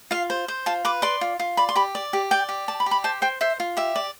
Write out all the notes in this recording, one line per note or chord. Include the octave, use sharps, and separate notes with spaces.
F4 F5
C5
C5
F4 A5
B4 D6
D5 C6
F4
F4
D5 B5
C6
G4 B5
D5
G4
D5 G5
G4
D5 A5
B5
G4
B5
C5 A5
C5 G5
C5 E5
F4
G4 E5
D5